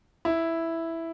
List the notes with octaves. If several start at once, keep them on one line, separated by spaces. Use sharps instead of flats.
E4